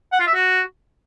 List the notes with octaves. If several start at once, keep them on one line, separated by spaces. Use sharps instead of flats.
F#5
F4
E5
F#4